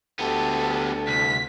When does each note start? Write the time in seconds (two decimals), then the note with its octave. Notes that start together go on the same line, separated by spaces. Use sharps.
0.19 D2 B3 G4 A4
1.08 C2 B6